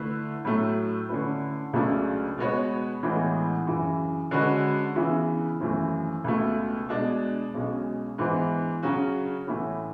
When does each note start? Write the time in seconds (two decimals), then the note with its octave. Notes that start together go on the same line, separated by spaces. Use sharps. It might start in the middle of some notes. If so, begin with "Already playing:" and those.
Already playing: D3 A3 E4 B4 E5
0.45 A2 F#3 A3
1.09 D3 A3 C#4 E4 B4
1.73 C#2 C#3 F#3 A3 D4
2.38 B2 G#3 B3 F#4 C#5
3.03 A1 A2 E3 G#3 B3
3.67 F#2 C#3 E3
4.31 D3 G#3 C#4 F#4 B4
4.95 C#3 E3 B3 E4
5.60 G#1 F#2 E3 A3
6.24 C#2 B2 A3
6.89 B2 G#3 D4
7.54 B1 B2 G#3 C#4
8.18 G#2 E3 B3
8.83 C#3 F#3 C#4 F#4
9.47 A1 A2 E3 A3 E4